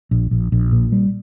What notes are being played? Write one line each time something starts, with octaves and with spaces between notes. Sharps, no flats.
A#1
A#1
A#1
A#2
G3